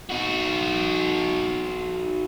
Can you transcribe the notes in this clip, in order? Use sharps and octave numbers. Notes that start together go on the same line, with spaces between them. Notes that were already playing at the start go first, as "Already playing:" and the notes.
D#4 F#4